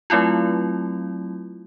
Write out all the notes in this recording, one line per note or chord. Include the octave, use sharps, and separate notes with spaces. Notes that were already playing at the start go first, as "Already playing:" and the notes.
F#3 A3 C4 E4 F4